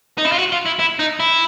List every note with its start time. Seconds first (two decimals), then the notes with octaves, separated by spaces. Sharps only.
0.18 D#4
0.25 E4
0.32 F4
0.39 F#4
0.52 F4
0.66 E4
0.79 E4
0.99 D#4
1.20 E4